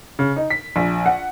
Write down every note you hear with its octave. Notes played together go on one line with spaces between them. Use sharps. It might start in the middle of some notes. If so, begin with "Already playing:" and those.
C#3
D#4
B6
A#1
F#5